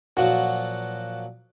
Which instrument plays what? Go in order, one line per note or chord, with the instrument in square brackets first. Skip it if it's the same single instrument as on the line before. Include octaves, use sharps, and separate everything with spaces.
[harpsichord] A#2 F3 F#3 [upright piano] F#4